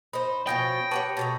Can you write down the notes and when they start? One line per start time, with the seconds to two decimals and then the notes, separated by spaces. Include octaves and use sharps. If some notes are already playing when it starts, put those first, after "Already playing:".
0.13 D#4 C5 B5
0.47 B2 F3 C#4 G5 D#6 G6 A#6
0.91 B3 G4 C#5 A5 C#6 F#7
1.17 B2 A3 A#5